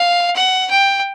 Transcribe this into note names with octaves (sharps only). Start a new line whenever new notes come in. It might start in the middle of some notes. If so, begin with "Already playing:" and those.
Already playing: F5
F#5
G5